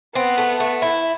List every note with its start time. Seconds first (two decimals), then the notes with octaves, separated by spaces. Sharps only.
0.15 B3 C4
0.38 A3
0.60 A3
0.82 E4